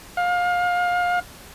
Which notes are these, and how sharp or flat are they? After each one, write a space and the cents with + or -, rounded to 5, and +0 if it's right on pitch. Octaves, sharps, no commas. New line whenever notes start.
F5 +25